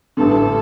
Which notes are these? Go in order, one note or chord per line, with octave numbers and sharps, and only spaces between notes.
A1 G2 D3 A4